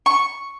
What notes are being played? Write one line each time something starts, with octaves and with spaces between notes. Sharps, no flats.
C#6